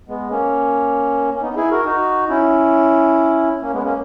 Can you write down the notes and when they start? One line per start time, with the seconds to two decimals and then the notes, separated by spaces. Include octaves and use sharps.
0.09 G#3 B3
0.31 A#3 C#4
1.35 C#4
1.42 B3 D#4
1.56 E4 G#4
1.71 F#4 A#4
1.85 D#4 F#4
2.30 C#4 E4
3.62 A#3 C#4
3.73 G#3 B3
3.84 A#3 C#4